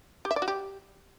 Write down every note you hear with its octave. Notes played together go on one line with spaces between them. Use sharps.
G4
E5
D5
F#4
G4